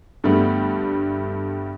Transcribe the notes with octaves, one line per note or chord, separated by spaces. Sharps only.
G2 D3 G3 A3 B3